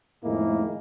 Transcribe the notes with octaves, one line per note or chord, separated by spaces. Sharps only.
F2 A2 D#3 G#3 A#3 E4